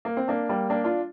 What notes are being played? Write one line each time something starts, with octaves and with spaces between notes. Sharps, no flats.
A#3
C4
A#3 D4
G3 A#3
A#3 D4
D4 F4